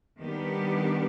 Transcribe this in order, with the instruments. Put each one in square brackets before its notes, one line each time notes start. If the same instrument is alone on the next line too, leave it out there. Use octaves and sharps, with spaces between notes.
[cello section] D#3 G3 B3 D4 G4